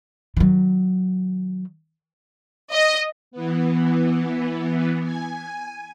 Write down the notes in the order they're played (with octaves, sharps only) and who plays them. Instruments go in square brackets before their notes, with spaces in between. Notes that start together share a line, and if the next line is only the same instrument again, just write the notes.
[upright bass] D#3 F#3
[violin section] D#5
[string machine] E3 B3
G#5